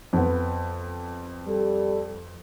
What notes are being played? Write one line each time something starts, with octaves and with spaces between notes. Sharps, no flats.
F2 B3
G3 A4